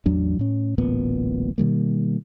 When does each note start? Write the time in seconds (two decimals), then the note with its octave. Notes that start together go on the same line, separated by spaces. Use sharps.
0.06 A1 E2 F#3 D4
0.39 A2 C#4
0.78 D1 A1 A#2 B3
1.58 B2 D#3 G3 A#3